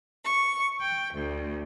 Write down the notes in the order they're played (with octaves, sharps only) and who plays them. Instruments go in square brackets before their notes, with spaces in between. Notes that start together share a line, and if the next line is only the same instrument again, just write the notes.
[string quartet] C#6
G5
D2